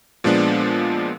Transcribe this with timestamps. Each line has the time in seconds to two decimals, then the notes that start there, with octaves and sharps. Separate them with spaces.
0.24 A#2 F3 G#3 B3 D4